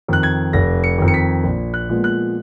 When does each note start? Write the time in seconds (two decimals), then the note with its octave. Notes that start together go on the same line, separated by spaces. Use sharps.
0.08 F2 D#3 F#6
0.23 G#6
0.53 F1 A#6
0.84 C#7
0.98 F2 D#3
1.08 C#7
1.14 B6
1.44 A#1
1.74 F#6
1.89 A#2 F3 G#3 B3
2.04 F#6